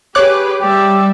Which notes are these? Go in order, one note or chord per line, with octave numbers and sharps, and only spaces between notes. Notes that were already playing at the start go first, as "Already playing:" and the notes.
G4 G#4 B4 C#5 D6 F#6
G3 G4 D5 E5